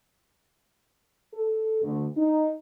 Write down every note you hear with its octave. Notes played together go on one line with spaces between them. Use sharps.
A4
D2
D#4